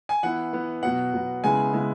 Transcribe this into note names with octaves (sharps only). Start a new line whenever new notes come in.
G#5
E3 B3 E4 F#5
E3 B3 E4
B2 F#3 B3 F#5
B2 F#3 B3
C#3 G#3 B3 E4 G#5
C#3 G#3 B3 E4